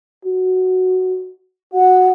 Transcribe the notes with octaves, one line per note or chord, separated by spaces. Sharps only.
F#4
F#4 F#5